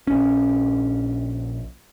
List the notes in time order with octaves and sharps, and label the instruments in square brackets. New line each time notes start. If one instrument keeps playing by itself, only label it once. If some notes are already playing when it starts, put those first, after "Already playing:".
[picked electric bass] A#1 C#4